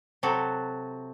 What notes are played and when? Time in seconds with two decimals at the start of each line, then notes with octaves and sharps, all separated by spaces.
0.23 C3 F#3 F#4 A4